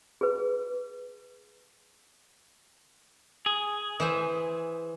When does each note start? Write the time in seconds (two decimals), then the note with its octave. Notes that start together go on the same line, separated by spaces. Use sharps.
0.21 G#4 B4
3.46 G#4
4.00 E3 C5 E5